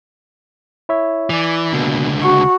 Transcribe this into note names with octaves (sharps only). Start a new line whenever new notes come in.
E4 C#5 E5
E3 D5 G#5
C#2 B2 D3 A#3
F#4 C#6